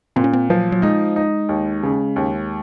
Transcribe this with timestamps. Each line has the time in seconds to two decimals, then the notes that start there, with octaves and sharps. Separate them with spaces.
0.16 A#2 C4
0.24 C#4
0.33 C4
0.50 F3 F#3
0.72 F#3
0.82 G#3 D#4
1.16 D#4
1.49 D#2
1.83 C#3
2.16 D#2